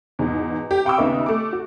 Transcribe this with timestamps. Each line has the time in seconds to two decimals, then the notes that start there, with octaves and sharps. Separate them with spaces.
0.19 E2 G#2 B2
0.71 G4
0.85 F5 G5 B5 C#6 D6 E6
0.98 D#2 C#3 B3 D#5 E5
1.26 A3 D6
1.53 F#4